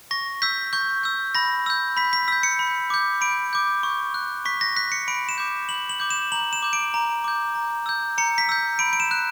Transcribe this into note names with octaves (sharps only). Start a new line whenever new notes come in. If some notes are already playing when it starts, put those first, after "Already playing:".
C#6 A#6
E6 G6 B6
C#6 G6
E6 G6
B5 A#6
E6 G6
B5 B6
B6
E6 G6 B6
C#7
B5
D6 G6
B5 D7
D6 G6
C#6
F#6
C#6 B6
A#6
F#6 B6
C#7
B5 D7
E7
D6 G6
B5 F#7
F#7
D6 G6
E7
A#5 F#7
E7
D6 G6
D7
A#5
D6 G6
A#5
E6 G6
A#5 C#7
B6
E6 G6
B5 D7
D7
E7
F#6